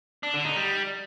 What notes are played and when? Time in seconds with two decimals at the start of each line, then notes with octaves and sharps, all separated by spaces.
0.23 D4
0.34 D3
0.45 D#4
0.56 G3